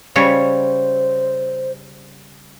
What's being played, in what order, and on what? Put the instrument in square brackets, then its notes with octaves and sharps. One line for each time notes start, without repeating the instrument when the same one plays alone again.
[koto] C#3 G3 C#5 [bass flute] C5